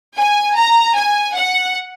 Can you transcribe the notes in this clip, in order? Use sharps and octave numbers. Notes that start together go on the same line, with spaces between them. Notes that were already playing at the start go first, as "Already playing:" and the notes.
G#5
A#5
G#5
F#5